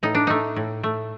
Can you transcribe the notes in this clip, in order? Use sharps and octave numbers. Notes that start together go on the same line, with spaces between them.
A2 D#4
D4
A3 D#4
A2
A3